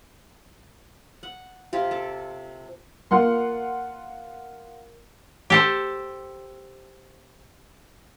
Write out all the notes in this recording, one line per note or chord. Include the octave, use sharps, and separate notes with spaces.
F#5
C3 F4 G4
A4
A#3 F4 F#5 C6
G4 A4 C5